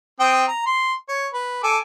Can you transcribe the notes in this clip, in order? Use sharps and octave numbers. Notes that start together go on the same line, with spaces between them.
C4 G5 D#6
A#5
C6
C#5
B4
A4 G#5 D6